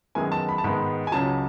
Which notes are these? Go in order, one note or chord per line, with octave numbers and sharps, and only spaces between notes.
F#2 D#3 G#3 B3 G#5
A5
B5
A5
G#2 D#3 G#3 B3 B5
G#5
C#2 C#3 F#3 A5